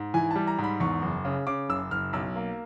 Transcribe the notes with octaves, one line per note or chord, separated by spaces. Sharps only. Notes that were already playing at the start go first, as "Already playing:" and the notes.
Already playing: G#2
E3 G#5
G3 A5
A#5
G#2
B5
E2 C#6
F#1
C#3
C#3 D6
F#1 E6
F#1 F6
B1 E6
A#3